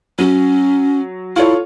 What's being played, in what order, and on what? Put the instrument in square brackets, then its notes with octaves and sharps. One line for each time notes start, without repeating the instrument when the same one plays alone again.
[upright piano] F#3 [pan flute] C#4
[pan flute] E4 [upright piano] F4 A4 C#5